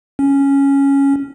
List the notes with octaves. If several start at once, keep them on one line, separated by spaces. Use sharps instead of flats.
C#4